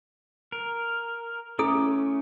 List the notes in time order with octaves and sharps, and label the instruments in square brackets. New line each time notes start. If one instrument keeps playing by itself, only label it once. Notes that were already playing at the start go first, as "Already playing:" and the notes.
[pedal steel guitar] A#4
[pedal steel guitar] A3 C#4 D6 [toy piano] E4 A4 D#6